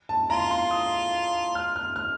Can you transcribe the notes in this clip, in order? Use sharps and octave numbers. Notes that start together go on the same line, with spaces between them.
A5
F4 A#5
C6
D#6
F6
F6
F6